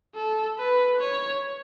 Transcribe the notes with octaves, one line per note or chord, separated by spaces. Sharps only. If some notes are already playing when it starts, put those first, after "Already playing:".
A4
B4
C#5